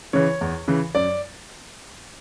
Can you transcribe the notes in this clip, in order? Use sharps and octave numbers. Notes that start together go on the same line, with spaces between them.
C#3 E3 C#5
E2
C#3 E3
F#2 D5